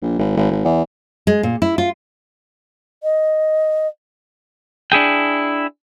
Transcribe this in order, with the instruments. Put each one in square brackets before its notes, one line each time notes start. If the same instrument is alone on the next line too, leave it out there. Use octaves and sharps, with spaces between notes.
[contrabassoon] A#1
G#1
G#1
G#1
E2
[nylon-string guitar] G#3
A#2
E4
F4
[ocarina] D#5
[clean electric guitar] D4 E4 G#4 G5